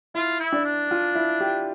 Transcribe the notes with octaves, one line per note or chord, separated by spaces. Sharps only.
E4 F4
E4
D4
D4
F4
E4
G4